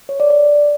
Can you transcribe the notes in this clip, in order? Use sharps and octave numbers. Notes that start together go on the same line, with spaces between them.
C#5
D5
D5